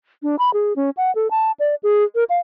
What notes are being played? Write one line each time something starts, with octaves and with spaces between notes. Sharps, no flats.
D4
B5
G#4
C#4
F#5
A4
A5
D5
G#4
A#4
F5